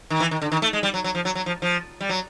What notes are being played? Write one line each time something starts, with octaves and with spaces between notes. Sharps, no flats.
D#3
E3
D#3
D3
D#3
A3
G#3
G3
F#3
F#3
F3
F#3
F#3
F3
F3
G3
F#3